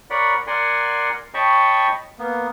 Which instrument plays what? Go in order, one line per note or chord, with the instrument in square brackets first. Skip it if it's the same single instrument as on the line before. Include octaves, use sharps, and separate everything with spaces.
[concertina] A#4 C#5 D5 F#5 B5
A#4 D5 F#5 G#5 C6
C#5 D#5 G5 A5 B5 C#6
A#3 B3